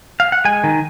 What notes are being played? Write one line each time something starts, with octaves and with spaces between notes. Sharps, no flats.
F5
F#5
G#3 G#5
D#3